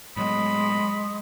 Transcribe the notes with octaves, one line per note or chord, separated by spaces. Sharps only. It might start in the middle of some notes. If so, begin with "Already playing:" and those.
A2 F#3 G#3 B3 D#5 B5 C6 D#6